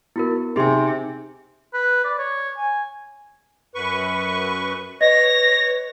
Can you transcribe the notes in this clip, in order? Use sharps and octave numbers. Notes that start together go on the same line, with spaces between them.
B3 E4 F#4 A#4
C3 D#4 G4 G#4 G#5 C6
B4
D5
C#5
G#5
F#2 B4 C#6
B4 C#5 D#5 A#6